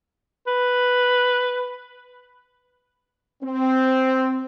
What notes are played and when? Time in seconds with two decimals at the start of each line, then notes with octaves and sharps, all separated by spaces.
0.47 B4
3.43 C4